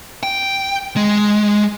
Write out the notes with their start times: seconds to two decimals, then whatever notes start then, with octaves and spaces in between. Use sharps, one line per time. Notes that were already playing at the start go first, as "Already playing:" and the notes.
0.23 G5
0.97 G#3